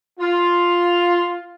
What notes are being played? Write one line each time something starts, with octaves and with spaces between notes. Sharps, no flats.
F4